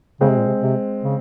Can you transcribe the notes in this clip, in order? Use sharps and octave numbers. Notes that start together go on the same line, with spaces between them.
C#3 G#3 C4
C3
A#2
C3
C3
C#3